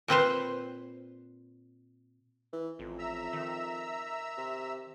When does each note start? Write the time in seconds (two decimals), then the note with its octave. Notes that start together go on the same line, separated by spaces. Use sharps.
0.08 A#2 C4 B4 C5
2.53 E3
2.79 A1 F2
2.99 E5 A#5 E6
3.33 D#3
4.37 C3